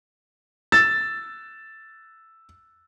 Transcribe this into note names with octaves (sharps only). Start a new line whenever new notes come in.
E6 A6